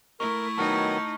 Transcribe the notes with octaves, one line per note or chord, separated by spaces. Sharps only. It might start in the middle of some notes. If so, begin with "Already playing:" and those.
A3 E4 A#4 C#6
D#3 F#3 B3 D#4 A5 C#6 F6